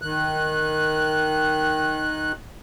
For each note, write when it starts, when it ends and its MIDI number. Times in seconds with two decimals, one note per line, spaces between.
0.02 2.32 51
0.02 2.32 90